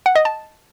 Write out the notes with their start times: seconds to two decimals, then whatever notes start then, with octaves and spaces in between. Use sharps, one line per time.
0.06 F#5
0.16 D#5
0.25 A5